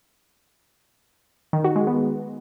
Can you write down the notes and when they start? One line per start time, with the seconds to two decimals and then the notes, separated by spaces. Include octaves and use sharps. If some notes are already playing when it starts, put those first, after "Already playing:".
1.53 D#3
1.64 F#4
1.76 G#3
1.87 B3